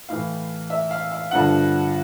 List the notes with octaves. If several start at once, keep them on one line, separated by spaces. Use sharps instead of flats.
A2 E3 F5
E5
F5
F5
G2 D3 F3 F#5